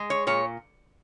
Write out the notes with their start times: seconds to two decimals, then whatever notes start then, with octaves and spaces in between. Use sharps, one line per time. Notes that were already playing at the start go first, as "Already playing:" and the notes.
Already playing: G#3
0.10 C#5
0.27 A#2 C#5